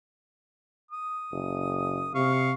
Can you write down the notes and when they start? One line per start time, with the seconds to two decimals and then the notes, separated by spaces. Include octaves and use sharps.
0.91 D#6
1.32 F#1
2.15 C3 F5 C#6